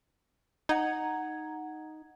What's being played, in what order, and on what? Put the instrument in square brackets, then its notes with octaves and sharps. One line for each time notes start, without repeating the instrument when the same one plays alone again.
[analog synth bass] D#4 [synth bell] F#5 A#5 G#6